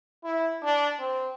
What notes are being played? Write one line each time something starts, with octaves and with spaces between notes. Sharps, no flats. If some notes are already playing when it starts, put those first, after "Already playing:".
E4
D4
C4